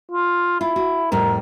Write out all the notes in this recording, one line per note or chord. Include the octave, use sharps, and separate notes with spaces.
F4
E4 F4
F#4
F2 A2 G3 A#4